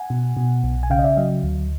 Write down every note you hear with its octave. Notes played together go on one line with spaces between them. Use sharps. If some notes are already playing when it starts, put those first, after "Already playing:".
Already playing: F#5 G#5
B2
B2
B1
G#5
C#3 F5 G5
D#5
D5 E5
F#3 D#5 F5
D2